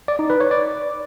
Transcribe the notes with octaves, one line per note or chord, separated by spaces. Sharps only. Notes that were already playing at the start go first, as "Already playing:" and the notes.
D5
D#4
B4
C#5
D5